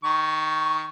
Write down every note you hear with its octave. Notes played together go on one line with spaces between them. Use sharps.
D#3 C#6